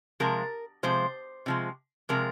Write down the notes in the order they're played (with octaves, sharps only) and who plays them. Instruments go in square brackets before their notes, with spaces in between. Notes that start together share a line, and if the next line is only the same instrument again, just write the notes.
[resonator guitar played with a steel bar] C3 F3 G#3 A#4
C3 F3 G#3 C5
C3 F3 G#3
C3 F3 G#3 A#4